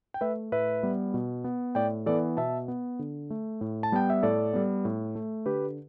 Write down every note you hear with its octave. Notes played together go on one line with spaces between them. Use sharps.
G5
A3 B4 E5
A2 B4 E5
G3 B3
B2
B3
A2 D5 G5
E3 B3 A4 D5
B2 E5 A5
B3
D3
A3
A2
A5
G3 B3 G5
E5
A2 A4 D5
G3 B3
A2
A3
D3 G4 B4